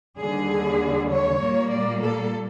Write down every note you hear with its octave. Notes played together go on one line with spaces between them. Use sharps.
D#2 D3 G3 G#4
C#5
A#2 G3 A#3
D5
A4